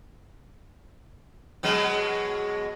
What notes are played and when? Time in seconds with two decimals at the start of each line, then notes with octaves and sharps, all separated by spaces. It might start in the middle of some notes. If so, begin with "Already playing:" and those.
1.63 B2 F#3 G#3